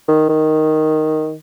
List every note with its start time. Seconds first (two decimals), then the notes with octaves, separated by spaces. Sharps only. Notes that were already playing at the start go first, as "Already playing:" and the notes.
0.08 D#3
0.29 D#3